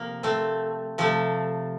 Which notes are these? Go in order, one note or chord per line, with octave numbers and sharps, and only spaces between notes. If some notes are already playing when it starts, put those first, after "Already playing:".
Already playing: C3 F3 A#3
A3 C4
C3 F3 A3